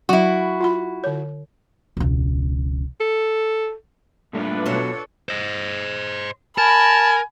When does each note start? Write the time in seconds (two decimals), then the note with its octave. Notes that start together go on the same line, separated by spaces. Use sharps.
0.09 F#3 E4 F#4
0.61 F4 F#5 B5
1.04 D3 C#5
1.97 E1 C#2
3.00 A4
4.33 G2 A#2 A3 D4 F4 B4
4.66 B2 F#3 A4 C#5
5.29 C5 D#5
6.58 A#4 G#5 A5 B5